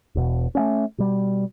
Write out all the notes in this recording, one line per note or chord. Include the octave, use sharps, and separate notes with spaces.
E1 B2
A3 A#3 C#4
B2 G3